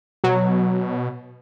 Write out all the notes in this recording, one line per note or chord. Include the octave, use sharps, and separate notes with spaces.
B2 F#3